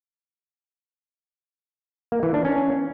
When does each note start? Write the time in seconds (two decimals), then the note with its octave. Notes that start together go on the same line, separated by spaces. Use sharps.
2.12 A#3
2.23 E3
2.34 D4
2.45 C#4